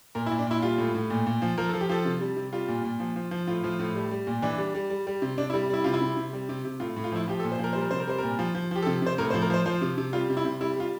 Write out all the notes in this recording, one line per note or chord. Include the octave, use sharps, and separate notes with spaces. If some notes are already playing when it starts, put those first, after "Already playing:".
A#2 A#4
E4
A#2
D4
A#2 E4
G3 F4
A2
A2
A#2
A#2
F3
F3 A#4
F3 A4
G4
F3 A4
C3
G3
C3
G3 F4
A#2
A#2
F3
F3
F3
A2 F4
F3
A2
G3
G3
A#2
E3 D4
G3
G3
G3
G3
C3
C3 D4
E4
G3
G3 E4
C3 F4
E4
C3
C3
G3
C3
C3
A2 F4
A2
F4
F3 E4
F3 G4
A4
A#2
C5
F3 A#4
G3 C5
A#4
C3 C5
A#4
G3 C5
A#2 A#4
F3
F3
F3 G4
A4
C3
C3 C5
A2 A#4
C5
F3
A#4
F3 C5
F3 C5
C3
C3
G3 F4
C3
E4
C3
G3 E4
G3 F4